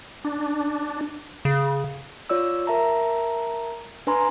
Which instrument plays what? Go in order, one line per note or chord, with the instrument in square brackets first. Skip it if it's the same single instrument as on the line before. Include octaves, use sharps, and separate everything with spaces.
[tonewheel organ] D4
[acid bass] C#3
[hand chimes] F4 C#5 D5 E6
A#4 E5 A5 A#5
D4 B4 G#5 A#5 C6